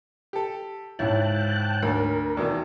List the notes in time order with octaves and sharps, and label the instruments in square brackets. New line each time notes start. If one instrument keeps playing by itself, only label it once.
[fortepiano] G4 A4
[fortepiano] C#2 E4 [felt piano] G#2 C#5 [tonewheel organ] G5 A5 F#6
[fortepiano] D2 [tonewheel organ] A#4
[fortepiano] E2 B2 D#3